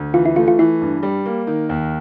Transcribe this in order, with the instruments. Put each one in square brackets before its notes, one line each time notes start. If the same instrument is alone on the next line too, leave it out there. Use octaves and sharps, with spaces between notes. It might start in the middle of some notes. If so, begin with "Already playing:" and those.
Already playing: [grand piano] D2
[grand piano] E3 [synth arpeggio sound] F4
[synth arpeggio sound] E4
[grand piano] A3 [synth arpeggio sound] F4
[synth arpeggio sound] F4
[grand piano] E3 [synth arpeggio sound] E4
[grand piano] G2
G3
A#3
D#3
D#2